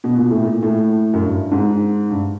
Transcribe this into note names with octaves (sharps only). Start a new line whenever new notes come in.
B2
A#2
A2
A#2
A2
F#2
G2
G#2
G2